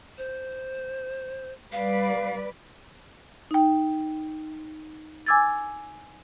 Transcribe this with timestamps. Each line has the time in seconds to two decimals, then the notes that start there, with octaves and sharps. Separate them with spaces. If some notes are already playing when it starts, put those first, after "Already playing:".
0.18 C5
1.72 G3 B4 D5 F5
3.51 D#4 G5
5.26 G#5 D6 E6 G#6 A6